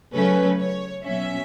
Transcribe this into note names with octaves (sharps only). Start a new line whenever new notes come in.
C#3 F#3 A3 C#4 B4
C#5
B2 F#3 C#4 E5